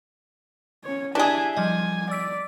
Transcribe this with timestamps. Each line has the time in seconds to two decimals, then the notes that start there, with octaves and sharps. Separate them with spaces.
0.84 C#4 C#5
1.15 D4 E4 G4 G#4 D5 E5 G#5
1.56 F3 G3 D#5 G#5
2.11 D5 E6 B6 D7